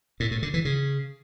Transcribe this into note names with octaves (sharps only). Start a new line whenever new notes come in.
A2
A2
D3
E3
C#3